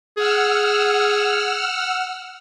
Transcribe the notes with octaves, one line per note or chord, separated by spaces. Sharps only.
G#4 F#5 E6 F6